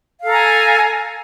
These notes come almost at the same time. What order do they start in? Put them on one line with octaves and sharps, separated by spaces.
F5 A4 A#5 G#5